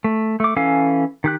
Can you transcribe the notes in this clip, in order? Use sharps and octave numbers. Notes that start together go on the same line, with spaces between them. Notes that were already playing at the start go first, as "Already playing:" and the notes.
A3
A3 D6
E3 C#4 A4 F5 G#5
D#3 G4 F#6